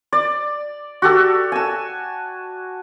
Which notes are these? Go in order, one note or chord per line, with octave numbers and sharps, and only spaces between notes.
D5
F#4 G4 A4
G#5 A5